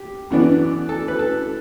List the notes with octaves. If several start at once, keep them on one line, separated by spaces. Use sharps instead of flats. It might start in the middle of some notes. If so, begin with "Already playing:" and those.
Already playing: G4
F#2 E3 B3 D4
A4
B4
A4